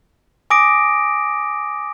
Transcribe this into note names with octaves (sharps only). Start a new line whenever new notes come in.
G#5 D6 D#6 A#6 D7